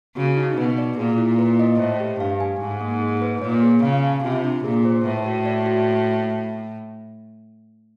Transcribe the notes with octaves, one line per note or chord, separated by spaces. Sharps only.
C#3 F#4
D#4
B2 B4
D5
A#2 G#4
E4
B4
D#5
A2 C5
G4
G2 F5
G#5
G#2 D#4
A#3
G#4
B4
A#2 C#5
G#4
C#3 F5
A5
C3 F4
D4
A#2 G#4
C5
A2 B4
F#4
D5
F#4